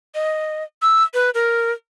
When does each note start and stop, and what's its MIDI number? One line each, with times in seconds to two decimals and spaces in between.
0.15 0.64 75
0.83 1.03 88
1.14 1.30 71
1.34 1.72 70